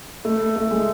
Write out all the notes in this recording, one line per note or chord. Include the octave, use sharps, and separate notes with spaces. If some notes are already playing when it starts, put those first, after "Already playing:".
A3
A3
G#3